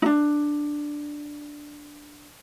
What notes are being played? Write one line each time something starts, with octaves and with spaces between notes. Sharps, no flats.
D4 D#4